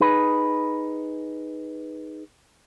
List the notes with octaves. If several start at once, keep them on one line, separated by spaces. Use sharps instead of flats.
D#4 G#4 B4